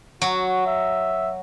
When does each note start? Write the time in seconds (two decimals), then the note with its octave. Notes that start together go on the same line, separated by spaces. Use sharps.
0.22 F#3 F#4
0.66 E5